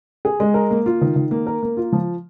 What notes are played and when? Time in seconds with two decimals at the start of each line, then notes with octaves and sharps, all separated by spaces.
0.25 G#4
0.40 G#3
0.54 A#4
0.71 A#3
0.86 F4
1.01 D#3
1.16 D#3
1.31 A#3
1.47 A#4
1.63 A#3
1.77 F4
1.92 F3